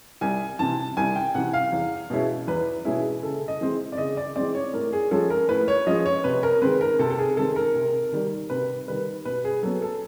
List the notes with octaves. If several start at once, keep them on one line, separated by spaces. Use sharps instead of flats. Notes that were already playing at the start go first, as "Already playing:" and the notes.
C2 G#5
C3 E3 A5
C2 G#5
G5
C3 E3 F#5
F5
E2
B2 G#3 C#4 E4
E2 B4
B2 G#3 C#4 E4 G#4
C#3 A4
D#5
E3 G#3 C4
D5
C#3 D#5
D5
E3 G#3 C4 D5
C#5
A2 A#4
G#4
F3 G#3 C#4 A4
A#4
A2 B4
C#5
F3 G#3 C#4 D#5
C#5
C3 B4
A#4
D#3 G#3 C4 B4
A#4
C3 A4
A4
G#4
D#3 G#3 C4 A4
A#4
C3
D#3 G3
C3 B4
D#3 G3 B4
B2 B4
G#4
F#3 B3 A4
A4